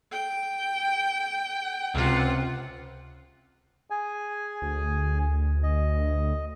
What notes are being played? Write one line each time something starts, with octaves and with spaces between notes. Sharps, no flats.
G5
C#2 C3 F4 F#5
G#4 G#5
D2
D#5